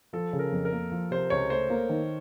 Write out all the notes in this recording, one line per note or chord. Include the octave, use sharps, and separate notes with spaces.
F3 A4
C#3
A#4
F2
A#4
A#3
F3
C3 C5
C#2 C#5
A3 C5
A#3
D#3